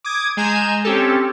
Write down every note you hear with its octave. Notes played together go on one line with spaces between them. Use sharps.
D6 D#6 G#6
G#3 G#5 A#5 G6 E7
C4 C#4 G4 A4